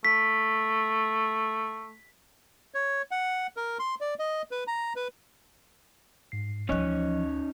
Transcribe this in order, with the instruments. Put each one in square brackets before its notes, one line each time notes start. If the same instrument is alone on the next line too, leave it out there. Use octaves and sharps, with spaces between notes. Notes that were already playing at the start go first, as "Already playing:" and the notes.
[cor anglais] A3 [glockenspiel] B6
[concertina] C#5
F#5
A#4
C6
D5
D#5
B4
A#5
B4
[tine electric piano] G#2 C7
[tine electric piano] D2 D#5 F#6 [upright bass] E3 F3 [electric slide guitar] C#4 D#4 C#5